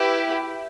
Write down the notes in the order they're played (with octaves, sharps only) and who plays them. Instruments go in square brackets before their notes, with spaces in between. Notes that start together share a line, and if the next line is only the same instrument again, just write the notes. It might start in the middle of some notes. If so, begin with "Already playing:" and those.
Already playing: [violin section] E4 G4 B4